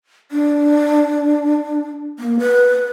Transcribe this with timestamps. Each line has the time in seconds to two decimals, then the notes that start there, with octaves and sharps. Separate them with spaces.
0.32 D4
2.19 A#3
2.39 B4